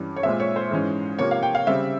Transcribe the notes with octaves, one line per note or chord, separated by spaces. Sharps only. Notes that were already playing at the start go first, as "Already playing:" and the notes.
Already playing: G2 E3 G3 C#4
C#5
A#2 G#3 C4 E5
C#5
C5
G#2 E3 G#3 C#4
C3 F3 A#3 C#5
F5
G5
F5
C#3 G3 C4 E5